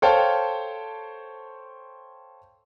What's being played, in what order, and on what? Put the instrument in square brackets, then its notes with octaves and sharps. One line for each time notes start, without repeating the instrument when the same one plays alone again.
[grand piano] A4 C5 C#5 F5 G5 A5